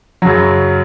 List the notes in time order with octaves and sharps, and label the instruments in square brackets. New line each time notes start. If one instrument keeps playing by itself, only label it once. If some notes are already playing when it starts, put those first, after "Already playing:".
[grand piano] F#2 C#3 F#3